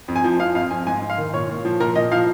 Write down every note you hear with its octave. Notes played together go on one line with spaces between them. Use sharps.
F2
G#5
F3
F3 F5
F2 F5
F2 G#5
G#2 G#5
G#2
F5
D#3
A#2 C#5
A#2
F3
A#2 A#4
A#2 D#5
F3 F5